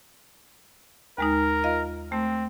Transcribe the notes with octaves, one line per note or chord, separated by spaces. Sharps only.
D#2 G#3 D#4 A#4
F4 D#5 F5
A3 C4